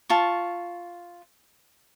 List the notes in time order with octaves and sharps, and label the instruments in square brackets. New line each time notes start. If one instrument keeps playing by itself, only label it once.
[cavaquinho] F4 A5 C#6